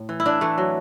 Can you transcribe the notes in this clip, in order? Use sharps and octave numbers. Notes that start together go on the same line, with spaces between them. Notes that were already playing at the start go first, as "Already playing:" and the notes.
Already playing: A2
E3
E4
E3 D4
E3 A3
F#3